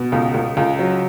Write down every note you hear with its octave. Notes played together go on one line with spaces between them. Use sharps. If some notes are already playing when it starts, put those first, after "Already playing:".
Already playing: B2
C#2
C#2
C#2
F#3